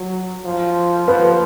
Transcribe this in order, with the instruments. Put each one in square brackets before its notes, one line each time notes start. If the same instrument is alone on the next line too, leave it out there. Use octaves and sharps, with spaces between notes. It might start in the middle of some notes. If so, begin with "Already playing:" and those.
Already playing: [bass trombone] F#3
F3
[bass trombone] F3 [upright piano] B4